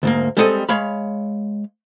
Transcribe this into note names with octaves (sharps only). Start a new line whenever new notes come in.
D2 G#2 A#3
G3 G#3 B3 C4 A4 D#5
G#3 C#5 F5 B5